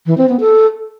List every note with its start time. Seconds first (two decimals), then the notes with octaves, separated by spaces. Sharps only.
0.06 E3
0.18 C4
0.29 B3
0.40 A4